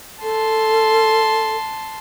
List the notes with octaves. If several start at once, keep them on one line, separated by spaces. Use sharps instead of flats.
A4 A5 C6